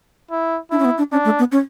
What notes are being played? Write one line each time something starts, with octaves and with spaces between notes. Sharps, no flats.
E4
D4 E4
C#4
B3
D4
C#4 D4
A3
B3
C#4